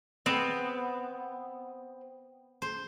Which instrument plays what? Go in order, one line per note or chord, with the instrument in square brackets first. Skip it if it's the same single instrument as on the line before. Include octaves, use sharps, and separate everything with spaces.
[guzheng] B3 [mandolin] C4
[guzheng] C5